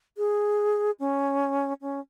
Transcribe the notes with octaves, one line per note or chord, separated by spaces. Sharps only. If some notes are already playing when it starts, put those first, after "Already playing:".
G#4
C#4
C#4